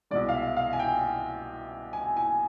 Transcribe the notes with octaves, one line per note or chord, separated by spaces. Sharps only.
C2 B2 G#3 D5
F5
E5
F5
G#5
G5
G#5
G#5